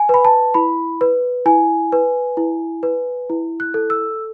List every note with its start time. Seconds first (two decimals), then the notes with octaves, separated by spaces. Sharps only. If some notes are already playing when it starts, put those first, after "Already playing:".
Already playing: G#5
0.09 B4 B5
0.25 A5
0.54 E4 B5
1.01 B4
1.46 E4 G#5
1.92 B4
2.37 E4
2.83 B4
3.30 E4
3.60 F#6
3.74 A4
3.90 E6